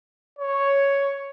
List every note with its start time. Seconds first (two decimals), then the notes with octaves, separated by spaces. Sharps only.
0.39 C#5